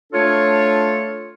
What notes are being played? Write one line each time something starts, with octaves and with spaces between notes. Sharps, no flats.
A3 D4 F4 A4 C#5